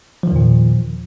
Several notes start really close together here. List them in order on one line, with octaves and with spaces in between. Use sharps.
F3 D#3 E2 A#2